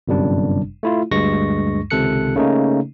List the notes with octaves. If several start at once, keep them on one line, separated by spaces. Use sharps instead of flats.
G1 F#2 C3 G3 D4
A3 E4 F4
D2 G2 G#3 C#6 A#6
C#2 C3 D#3 A4 F#6 C#7
C#3 A3 A#3 C#4 D#4